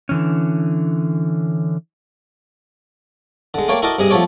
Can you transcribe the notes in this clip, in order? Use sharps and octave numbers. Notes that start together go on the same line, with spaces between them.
D3 E3 C#4
D3 G#3
A3 A#3 C#5 D5 G5
E4 F#4 A4 A#4 D5 D#5
G2 C3 G#4 D#5 D#6
F3 A3 B3 A4 C#5 D5